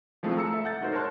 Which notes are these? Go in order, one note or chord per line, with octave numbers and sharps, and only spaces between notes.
F3 G#3 A3 C4 E4 F4
A#5 E6 C#7
A4 E5
F#5 G6 A6
G#3 D#4 F#4 A#4 C5
A#4 C#5 A5 C6 F#6